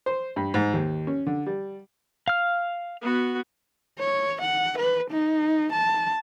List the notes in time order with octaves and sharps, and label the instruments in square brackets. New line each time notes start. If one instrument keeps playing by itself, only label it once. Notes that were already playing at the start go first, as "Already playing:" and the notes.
[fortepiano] C5
G2
G#2
D#2
C#4
D3
G3
[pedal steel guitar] F5 F6
[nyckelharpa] B3 F#4
[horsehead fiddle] C#5
F#5
B4
D#4
A5